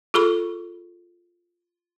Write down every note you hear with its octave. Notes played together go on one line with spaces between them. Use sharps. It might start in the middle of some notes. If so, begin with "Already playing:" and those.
F4 G#4 A4 B5 C#6